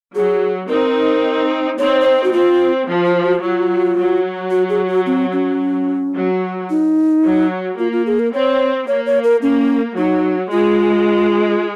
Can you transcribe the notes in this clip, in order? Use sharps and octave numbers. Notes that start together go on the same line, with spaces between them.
F#3 G#4
C4 D#4 A#4
C4 D#4 C#5
C#5
C5
F#4
C4 F4
F3
F4
F#4
F#3 F4
F#3
F#4
G#4
F#4
C4
C#4
F#3
D#4
F#3
A#3 F4
F4
G#4
A#4
C4 C#5
A#3 C#5
C#5
A#4
A#3 C#4
F#3 D#4
G#3 F4